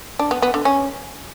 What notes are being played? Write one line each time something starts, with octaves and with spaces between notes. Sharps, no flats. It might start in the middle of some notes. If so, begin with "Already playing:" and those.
D4
B3
B3
D3
C#4